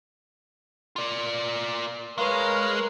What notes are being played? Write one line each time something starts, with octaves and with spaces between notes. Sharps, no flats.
F4 D5
G#3 A#4 B4 C#5 F5